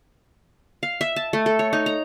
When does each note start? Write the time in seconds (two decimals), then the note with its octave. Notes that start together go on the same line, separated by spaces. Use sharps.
0.83 F5
1.01 E5
1.16 A5
1.33 A3
1.46 A4
1.59 C#5
1.73 D#4
1.86 A#5